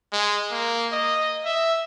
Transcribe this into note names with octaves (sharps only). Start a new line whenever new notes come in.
G#3
A#3
D#5
E5